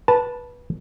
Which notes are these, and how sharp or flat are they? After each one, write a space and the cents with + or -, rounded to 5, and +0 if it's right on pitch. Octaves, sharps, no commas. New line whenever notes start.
B4 -15 A5 +0